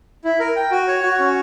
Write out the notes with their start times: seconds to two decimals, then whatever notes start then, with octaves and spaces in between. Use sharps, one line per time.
0.24 E4
0.40 A#4
0.56 G5
0.71 F#4
0.87 C#5
1.03 F#4
1.20 C#4